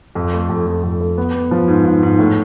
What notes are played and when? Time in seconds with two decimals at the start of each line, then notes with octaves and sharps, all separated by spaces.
0.15 F2
0.34 A3
0.49 F2
0.67 F2
0.84 F2
1.01 A3
1.18 B3
1.35 B3
1.51 F3
1.68 G#2
1.85 G#2
2.03 G#2
2.19 A2